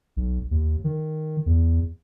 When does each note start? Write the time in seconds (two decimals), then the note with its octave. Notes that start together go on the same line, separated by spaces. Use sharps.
0.16 B1
0.51 D#2
0.84 D#3
1.46 E2